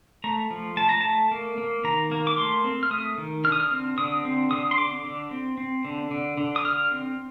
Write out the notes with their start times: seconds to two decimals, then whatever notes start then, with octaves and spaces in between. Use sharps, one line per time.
0.24 A3 A#5
0.50 F3
0.77 A3 A5
0.89 A#5
1.01 A3 A5
1.31 A#3
1.58 A#3
1.84 D#3 A#5
2.11 A#3
2.27 D6
2.38 A3 C6
2.64 C4
2.83 F6
2.91 A3 D#6
3.18 D#3
3.44 D3 F6
3.52 D#6
3.60 F6
3.71 C4
3.98 D3 D#6
4.25 C4
4.51 D3 D#6
4.71 C6
4.78 D3 D6
5.04 D3
5.31 C4
5.58 C4
5.85 D3
6.11 D3
6.38 D3
6.56 D#6
6.65 D3 F6
6.91 C4